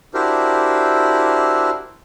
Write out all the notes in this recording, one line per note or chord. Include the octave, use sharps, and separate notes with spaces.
D4 E4 F#4 G4 A#4 C5